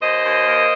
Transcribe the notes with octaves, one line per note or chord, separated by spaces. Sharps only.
D#2 C5 D#5
D#2
A#3